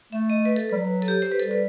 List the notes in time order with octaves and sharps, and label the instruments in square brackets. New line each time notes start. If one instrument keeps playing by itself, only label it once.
[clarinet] A3 [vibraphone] E5
[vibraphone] D#5
B4
A4
[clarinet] G3 [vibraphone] B4
[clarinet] F#3
[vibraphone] A4
G4
C5
B4
[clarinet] G3 [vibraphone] A4
[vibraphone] B4